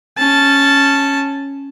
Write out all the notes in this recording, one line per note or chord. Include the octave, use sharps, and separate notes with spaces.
C#4 A5